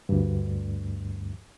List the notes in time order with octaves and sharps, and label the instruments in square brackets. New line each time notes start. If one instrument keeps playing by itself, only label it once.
[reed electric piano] D2 G2